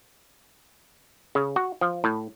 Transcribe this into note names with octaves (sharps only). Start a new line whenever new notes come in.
C#3
F#4
F3
A2